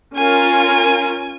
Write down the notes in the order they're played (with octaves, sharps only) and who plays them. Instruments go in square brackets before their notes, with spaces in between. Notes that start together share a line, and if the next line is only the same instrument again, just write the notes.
[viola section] C#4 F4 A#4 [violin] G#5